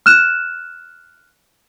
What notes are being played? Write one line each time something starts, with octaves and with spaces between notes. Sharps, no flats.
F6 F#6 E7